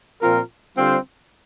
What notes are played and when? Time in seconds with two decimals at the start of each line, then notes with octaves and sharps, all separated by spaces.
0.20 A#2 F3 C4 F4 A#4
0.77 D3 G3 C4 F4 C5